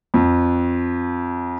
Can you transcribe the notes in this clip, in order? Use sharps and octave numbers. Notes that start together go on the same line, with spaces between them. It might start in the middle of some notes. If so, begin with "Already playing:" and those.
F2